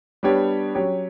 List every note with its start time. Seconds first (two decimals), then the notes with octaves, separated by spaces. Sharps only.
0.23 G3 B3 D4 G4 C#5
0.75 F#3 C#4 G4 C#5